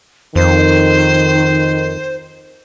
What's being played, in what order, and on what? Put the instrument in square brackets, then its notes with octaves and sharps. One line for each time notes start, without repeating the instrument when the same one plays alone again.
[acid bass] F2 [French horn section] D#3 [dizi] C5